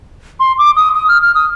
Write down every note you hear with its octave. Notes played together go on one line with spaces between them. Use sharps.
C6
D6
D#6
D#6
F6
F6
D#6